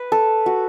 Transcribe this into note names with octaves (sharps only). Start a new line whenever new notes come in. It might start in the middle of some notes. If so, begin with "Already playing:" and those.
Already playing: B4
A4
F#4